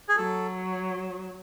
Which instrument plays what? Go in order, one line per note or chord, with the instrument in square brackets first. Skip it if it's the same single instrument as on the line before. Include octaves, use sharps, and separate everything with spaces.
[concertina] G#4
[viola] F#3 [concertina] A4